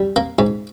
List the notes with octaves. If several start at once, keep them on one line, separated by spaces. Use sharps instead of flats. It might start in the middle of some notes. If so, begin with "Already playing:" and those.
Already playing: G3
A#3
G#2